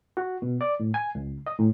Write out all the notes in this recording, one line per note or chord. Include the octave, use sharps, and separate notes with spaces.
F#4
B2
D5
A2
G#5
C#2
D#5
A2